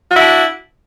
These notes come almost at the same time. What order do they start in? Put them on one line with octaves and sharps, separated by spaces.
F#4 E4 D4